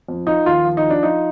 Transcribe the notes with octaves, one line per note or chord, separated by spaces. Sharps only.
F2
F3 D#4
D#2 F4
F3
D#4
F3
D4
F3 D#4